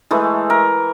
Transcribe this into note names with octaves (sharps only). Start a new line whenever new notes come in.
E3 G#3 A3
A#4